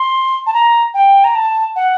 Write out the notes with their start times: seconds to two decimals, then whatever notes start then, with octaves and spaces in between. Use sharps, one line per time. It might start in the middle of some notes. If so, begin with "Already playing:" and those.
Already playing: C6
0.46 A5
0.54 A#5
0.94 G5
1.24 A#5
1.35 A5
1.76 F#5